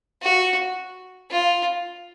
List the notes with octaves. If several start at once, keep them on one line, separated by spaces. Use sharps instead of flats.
F#4
F4